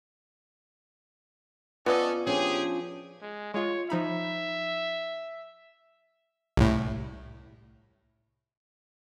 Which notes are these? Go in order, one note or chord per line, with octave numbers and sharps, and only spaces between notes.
B3 C#4 F4 A4 D5 D#5
F3 C#4 D4 G4 G#4
G#3
G#3 F4 C#5
F3 D#4 E5 B5
C2 A2